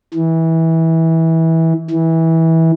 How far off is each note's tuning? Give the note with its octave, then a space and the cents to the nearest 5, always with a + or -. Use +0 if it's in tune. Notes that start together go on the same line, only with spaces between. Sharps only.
E3 -20
E3 -20